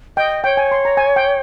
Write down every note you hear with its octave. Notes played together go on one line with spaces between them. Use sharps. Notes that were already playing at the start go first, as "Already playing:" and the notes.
D#5 G5
C#5 G5
G#5
C6
A#5
G#5
G5